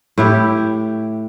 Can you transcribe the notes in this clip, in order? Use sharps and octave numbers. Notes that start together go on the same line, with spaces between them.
A2 E4 G4